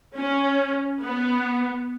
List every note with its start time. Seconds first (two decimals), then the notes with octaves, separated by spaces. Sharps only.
0.16 C#4
1.03 B3